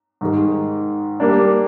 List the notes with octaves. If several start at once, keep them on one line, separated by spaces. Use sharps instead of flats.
G#2 D#3 G#3
G3 A#3 D4